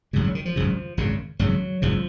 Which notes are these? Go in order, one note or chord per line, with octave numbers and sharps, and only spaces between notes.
G#1 F#2 C#3 G#3
F#3
D#3
F3
G#1 F#2 C#3
G#1 F#2 C#3
G#1 F#2 C#3 F#3
G#1 F#2 C#3 F3